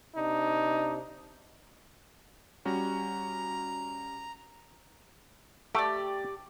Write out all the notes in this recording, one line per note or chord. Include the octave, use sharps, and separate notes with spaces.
C3 D4 D#4
G3 C#4 F#4 A#5
A3 G4 D5